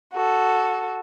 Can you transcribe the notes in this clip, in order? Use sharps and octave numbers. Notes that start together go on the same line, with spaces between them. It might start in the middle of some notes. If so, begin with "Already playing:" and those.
F#4 A4